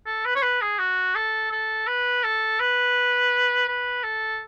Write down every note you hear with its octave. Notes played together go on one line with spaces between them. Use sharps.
A4
B4
C#5
B4
G#4
F#4
A4
A4
B4
A4
B4
B4
A4